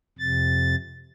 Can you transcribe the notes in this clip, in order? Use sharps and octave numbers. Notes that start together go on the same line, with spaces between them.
F2 C3 A6